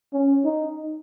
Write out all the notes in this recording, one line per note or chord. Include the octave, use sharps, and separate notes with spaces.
C#4
D#4